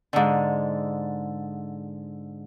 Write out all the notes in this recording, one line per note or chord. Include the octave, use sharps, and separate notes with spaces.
G#2 D3